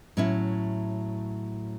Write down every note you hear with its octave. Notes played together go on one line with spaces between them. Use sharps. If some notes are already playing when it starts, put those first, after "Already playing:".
A2 F#3 C#4 E4